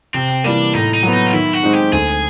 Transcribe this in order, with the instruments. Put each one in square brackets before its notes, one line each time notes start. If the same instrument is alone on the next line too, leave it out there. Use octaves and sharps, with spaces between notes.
[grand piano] C3 [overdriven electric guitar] C4
[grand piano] E3 G3 A#3 [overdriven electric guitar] D4
[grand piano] A2 [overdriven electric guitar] D#4
[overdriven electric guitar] D#4
[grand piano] F#3 B3
[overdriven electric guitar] D#4
F4
[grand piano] D#3 [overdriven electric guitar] E4
[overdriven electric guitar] F#4
[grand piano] G#3 C4 D#4
[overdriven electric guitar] G4
[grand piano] D2 [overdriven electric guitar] G#4